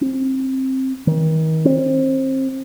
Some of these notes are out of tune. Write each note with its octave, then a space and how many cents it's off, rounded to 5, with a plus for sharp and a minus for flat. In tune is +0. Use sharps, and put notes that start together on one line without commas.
C4 +15
D#3 +35
C4 +25